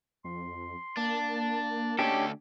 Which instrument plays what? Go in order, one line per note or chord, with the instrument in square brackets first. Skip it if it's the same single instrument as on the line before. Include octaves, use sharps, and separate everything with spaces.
[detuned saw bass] F2 [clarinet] C6
[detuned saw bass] A#3 [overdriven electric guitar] D4 [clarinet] A5
[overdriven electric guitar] D2 A4 [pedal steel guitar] C#4 D4 G4 [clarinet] D#5